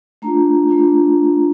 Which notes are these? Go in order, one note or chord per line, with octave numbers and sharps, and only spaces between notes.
A3 D4 F4 A#5
A3 D4 F4